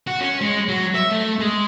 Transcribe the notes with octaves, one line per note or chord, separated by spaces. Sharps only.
F#4
C#4
G#3
F#3
E5
A3
G#3